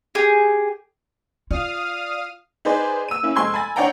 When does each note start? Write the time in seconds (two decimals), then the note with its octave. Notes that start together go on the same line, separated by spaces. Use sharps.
0.15 G4 G#4
1.51 F4 D5 F5 D#6 F6
2.65 D#4 G#4 B4 C5 D5
3.08 E6 D#7
3.23 A#3 C#4 E4
3.36 F1 G#3 C4 C6 E6 G#6
3.54 G#5 B5 A6
3.76 D4 C#5 D5 F#5 G5 A#5